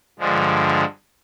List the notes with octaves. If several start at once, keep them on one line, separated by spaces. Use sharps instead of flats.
G2 D3 F3 G#3